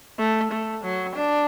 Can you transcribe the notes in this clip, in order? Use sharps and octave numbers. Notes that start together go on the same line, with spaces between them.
A3
A3
F#3
D4